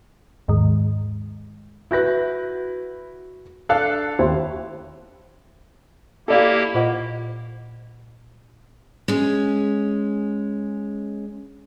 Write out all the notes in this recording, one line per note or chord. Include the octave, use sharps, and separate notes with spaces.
D#2 G#2 D#3 G#3
E4 F#4 B4 G6 A#6
D4 A4 F5 F#6
D#2 E4 C5
A#3 E4 G4 A4 D5 F5
A#2 F4 C5 D#5 F#5
G#3 C#4